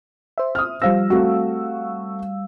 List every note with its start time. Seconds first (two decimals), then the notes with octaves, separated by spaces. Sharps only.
0.38 C5 E5
0.55 D#6 F6
0.82 F3 G3 C5 F5 E6 A#6
1.10 A3 C4 F#4